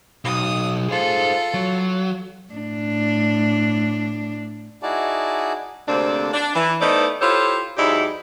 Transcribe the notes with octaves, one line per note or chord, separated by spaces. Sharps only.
B1 D#6
F4 G#4 A4 C5
F#3
A2 D4
D#4 E4 F#4 G#4 D5 A5
D2 C3 A#3 C4 D4 D5
D4
E3
A3 B3 D#4 E4 C5 D5
E4 F4 G4 A4 C5 C#5
G#2 F#3 D#4 E4 G4 D5